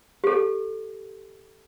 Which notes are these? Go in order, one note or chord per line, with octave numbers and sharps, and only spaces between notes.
G4 A4